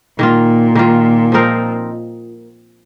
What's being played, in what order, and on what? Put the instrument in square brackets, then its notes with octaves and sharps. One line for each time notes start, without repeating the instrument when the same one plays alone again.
[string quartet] A#2 [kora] D#3 A#3 F4
[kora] D#3 A#3 F4
F3 C4 D#4 A#4